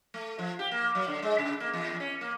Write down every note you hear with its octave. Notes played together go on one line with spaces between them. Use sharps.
A3
F3
G4
A#3
F#3
D3
G#3
C#3
A#3
E2
C#4
A#3